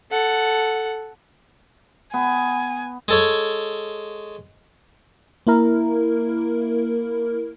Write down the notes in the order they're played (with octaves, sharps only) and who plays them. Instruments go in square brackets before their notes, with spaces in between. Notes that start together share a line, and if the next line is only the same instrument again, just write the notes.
[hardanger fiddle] A4 F#5
[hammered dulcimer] B3 [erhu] G#5
[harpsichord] G#3 A4 C#5
[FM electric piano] A#3 E4 A#4